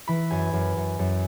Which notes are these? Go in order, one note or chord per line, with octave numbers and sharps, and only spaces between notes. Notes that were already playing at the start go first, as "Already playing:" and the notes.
E3 B5
F#2 G#5
F#2
F#2
F#2